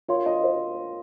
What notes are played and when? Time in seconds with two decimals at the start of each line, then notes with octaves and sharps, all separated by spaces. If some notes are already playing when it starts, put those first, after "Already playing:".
0.09 F4 A#4 C#5 F5 C6
0.26 D#5
0.43 C5